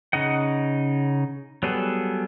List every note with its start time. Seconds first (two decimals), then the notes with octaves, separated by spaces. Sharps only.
0.13 C#3 D#4 D#5 F#5
1.63 F#3 G3 B3 G#4 A4